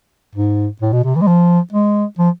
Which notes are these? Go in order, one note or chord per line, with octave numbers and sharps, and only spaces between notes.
G#2
A2
B2
C3
E3
G#3
F3
G#3
F3